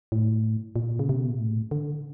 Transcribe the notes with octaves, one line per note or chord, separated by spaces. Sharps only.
A2
A#2
C#3
C3
B2
A#2
A2
D3